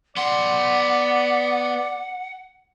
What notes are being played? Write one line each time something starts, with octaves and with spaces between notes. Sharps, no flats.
B3 D5 F#5 C6